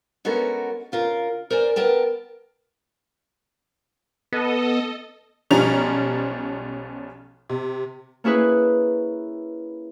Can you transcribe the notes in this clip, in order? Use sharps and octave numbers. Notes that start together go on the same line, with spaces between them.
G#3 B3 C#4 F#4 A4 A#4
C#3 F4 A#4
A#4 C5 D5 G#5
B3 A#4 G5 A5
B3 A4 D#5
B1 F3 G3 C#4 A#5 F7
C3
A#3 C#4 E4 G#4 B4